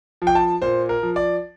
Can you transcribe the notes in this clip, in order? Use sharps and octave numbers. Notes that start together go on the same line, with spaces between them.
F3
G5
A5
A#2 C5
A#4
F3
D5